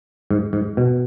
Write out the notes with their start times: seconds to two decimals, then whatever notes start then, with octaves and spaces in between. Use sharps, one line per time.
0.31 G#2
0.53 G#2
0.77 B2